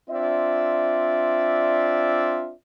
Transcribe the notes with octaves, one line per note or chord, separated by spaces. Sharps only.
C4 D4 F4 D5 E5